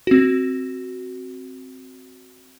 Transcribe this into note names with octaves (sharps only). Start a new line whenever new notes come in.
C4 F#4